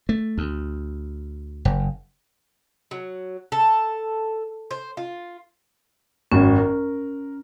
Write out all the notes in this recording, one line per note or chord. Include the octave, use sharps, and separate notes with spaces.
A3
D2
F#1
F#3
A4
C5
F4
G#1 F#2 C#4
A#4